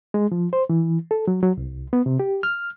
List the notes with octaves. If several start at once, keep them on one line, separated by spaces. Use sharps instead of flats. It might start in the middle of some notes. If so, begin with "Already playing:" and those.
G#3
F3
C5
E3
A4
F#3
F#3
C2
B3
C3
G4
F6